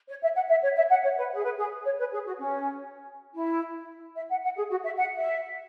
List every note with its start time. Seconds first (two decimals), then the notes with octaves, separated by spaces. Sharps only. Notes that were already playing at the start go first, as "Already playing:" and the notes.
0.09 C#5
0.22 E5
0.35 F#5
0.50 E5
0.63 C#5
0.76 E5
0.90 F#5
1.04 C#5
1.17 B4
1.33 G#4
1.44 B4
1.58 G#4
1.85 C#5
1.99 B4
2.13 G#4
2.26 F#4
2.40 C#4
3.35 E4
4.16 E5
4.30 F#5
4.44 F#5
4.57 G#4
4.70 F#4
4.84 E5
4.98 F#5
5.18 E5